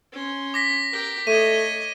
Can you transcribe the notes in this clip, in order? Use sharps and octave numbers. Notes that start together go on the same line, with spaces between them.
C#4 C6
D6 A#6 B6
G4 A#4
A3 C#5 D#5 D#7